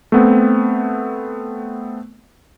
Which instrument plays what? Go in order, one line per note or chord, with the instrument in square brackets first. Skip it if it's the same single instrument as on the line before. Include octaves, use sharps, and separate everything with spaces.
[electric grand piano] A3 B3 C4